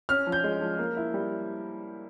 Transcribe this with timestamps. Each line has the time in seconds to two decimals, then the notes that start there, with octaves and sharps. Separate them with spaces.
0.09 C#4 F6
0.27 F3
0.32 G6
0.44 G#3
0.61 F3
0.79 A#3
0.96 E4
1.14 G3